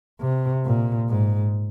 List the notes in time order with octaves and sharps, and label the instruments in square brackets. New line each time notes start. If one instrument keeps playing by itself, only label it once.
[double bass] C3
A#2
G#2